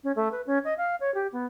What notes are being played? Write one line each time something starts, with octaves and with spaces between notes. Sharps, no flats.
C#4
A3
B4
C#4
D#5
F5
C#5
G4
B3